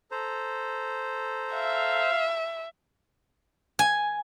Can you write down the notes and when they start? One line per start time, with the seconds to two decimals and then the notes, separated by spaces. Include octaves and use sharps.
0.11 A4 C5 A#5
1.54 E5 F5
3.79 G#5